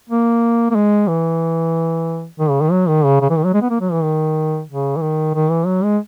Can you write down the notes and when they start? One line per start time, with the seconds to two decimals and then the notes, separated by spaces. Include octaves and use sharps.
0.10 A#3
0.71 A#3
0.75 G#3
1.08 E3
2.39 D#3
2.50 C#3
2.61 D#3
2.72 F#3
2.88 D#3
3.05 C#3
3.21 C#3
3.30 E3
3.38 D#3
3.45 F#3
3.54 G#3
3.62 B3
3.70 A#3
3.81 F#3
3.92 E3
4.03 D#3
4.69 C#3
4.96 E3
5.02 D#3
5.34 D#3
5.50 E3
5.66 F#3
5.83 G#3